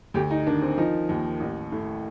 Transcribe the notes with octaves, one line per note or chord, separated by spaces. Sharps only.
D2 G4
D#4
D#3 D4
C4
F3 D#4
D#2
A1
A2